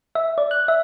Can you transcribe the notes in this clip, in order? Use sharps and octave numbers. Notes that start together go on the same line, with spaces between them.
E5
D5
F#6
E5